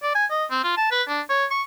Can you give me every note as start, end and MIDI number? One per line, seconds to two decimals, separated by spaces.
0.03 0.14 74
0.15 0.25 80
0.30 0.45 75
0.50 0.63 60
0.64 0.74 65
0.77 0.88 81
0.91 1.03 71
1.08 1.21 62
1.29 1.45 73
1.51 1.62 85